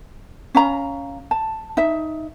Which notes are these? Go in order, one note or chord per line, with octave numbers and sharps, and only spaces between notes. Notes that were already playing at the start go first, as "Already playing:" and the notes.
C#4 F5 A#5
A5
D#4 E5